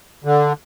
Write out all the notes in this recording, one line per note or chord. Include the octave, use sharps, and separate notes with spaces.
D3